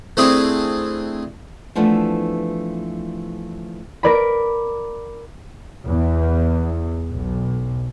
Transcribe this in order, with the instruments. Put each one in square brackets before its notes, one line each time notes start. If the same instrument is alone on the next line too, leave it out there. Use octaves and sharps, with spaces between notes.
[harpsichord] A3 C4 D4 E4 G#4
[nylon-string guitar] E3 F3 A3 B3 D4
[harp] A#4 D5 B5
[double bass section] E2
B1